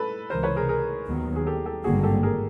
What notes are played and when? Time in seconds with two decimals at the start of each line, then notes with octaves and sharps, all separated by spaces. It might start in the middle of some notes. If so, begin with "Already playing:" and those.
Already playing: A4 B4
0.30 C#2 C3 E3 A#4 C5
0.43 B4 C#5
0.56 G#4 A#4
0.69 G#4 A#4
1.07 D#2 D#3 F#3 B3
1.36 G#4
1.46 G4 A4
1.66 G4 A4
1.84 G#1 G2 D3 G3 A#3 F#4 G#4
2.03 G4 A4
2.23 G#4 A#4